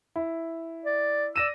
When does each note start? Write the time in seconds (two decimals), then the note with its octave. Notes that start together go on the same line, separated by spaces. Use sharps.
0.16 E4
0.86 D5
1.36 D5 E6 A#6 D#7